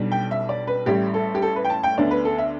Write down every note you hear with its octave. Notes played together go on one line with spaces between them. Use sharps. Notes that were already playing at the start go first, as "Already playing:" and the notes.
Already playing: B1 B2 G3 D4
G5
E5
D5
B4
A1 A2 G3 G4
A4
G4
A4
B4
G5
A5
G5
D2 D3 B3 D4 D5
B4
A4
E5